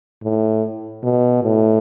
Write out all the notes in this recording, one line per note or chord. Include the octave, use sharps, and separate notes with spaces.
A2
B2
A2